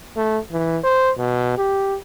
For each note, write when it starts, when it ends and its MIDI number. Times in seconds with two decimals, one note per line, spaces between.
0.17 0.38 57
0.51 0.78 52
0.84 1.11 72
1.18 1.57 47
1.58 1.97 67